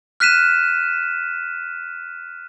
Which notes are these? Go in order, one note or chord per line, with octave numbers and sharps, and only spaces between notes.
F6 F#6 B6 D#7 E7